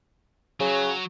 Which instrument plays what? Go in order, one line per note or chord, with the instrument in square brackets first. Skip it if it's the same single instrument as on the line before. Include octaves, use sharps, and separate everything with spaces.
[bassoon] C#3 [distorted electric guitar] F#3